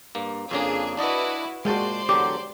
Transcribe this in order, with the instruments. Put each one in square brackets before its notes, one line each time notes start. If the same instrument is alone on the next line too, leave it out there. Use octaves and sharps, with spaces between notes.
[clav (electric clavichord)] G2 A#3
[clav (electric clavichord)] F2 C#3 A#3 [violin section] D4 G#4
[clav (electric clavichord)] D4 D5 D#5 [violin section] E4 F#4 B4
[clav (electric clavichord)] A#2 G5 A5 [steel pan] G#3 F#4 [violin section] C5 D5 C6
[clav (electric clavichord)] E2 D3 F#3 [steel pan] G4 [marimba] D6